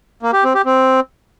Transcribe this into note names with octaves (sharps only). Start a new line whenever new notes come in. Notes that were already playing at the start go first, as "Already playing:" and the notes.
A#3
G4
C4
G4
C4